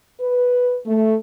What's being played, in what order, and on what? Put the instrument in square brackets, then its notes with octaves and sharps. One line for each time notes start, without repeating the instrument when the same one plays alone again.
[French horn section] B4
A3